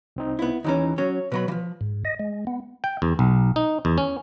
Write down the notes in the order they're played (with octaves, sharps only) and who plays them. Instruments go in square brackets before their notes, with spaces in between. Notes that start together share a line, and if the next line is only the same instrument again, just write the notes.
[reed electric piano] C2 C4 D#4
[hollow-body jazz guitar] B3 E4
[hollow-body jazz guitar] D#2 E3 C#4 [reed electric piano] D#4 A#5
[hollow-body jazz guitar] F#3 C#4 [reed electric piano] C#5
[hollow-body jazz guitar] B2 F#3 B5 [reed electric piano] B4
[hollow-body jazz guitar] E3 F3
[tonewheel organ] G#2
D#5
G#3
B3
[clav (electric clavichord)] G5
E2
B1
D#4
E2
C#4